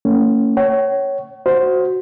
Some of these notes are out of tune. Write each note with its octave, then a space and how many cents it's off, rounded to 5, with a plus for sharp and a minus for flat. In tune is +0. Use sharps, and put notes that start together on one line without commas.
A#3 -40 C#4 +0
C#5 +0 F#5 +45
F#4 +0 C5 +0